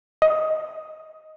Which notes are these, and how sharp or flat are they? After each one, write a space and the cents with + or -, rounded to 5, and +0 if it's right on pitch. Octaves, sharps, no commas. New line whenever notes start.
D#5 +10